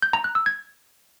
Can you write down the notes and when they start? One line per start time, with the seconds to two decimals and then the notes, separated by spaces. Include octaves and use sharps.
0.02 G6
0.13 A#5
0.24 F#6
0.35 E6
0.46 G#6